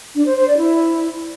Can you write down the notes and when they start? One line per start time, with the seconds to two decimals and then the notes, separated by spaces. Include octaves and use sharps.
0.15 D4
0.26 C5
0.37 C5
0.47 D5
0.58 E4